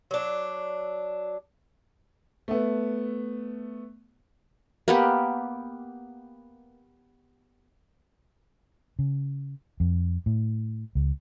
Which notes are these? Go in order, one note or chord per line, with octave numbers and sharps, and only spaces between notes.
F#3 D4
A3 B3
A#3 B3 G4
C#3
F2
A2
C#2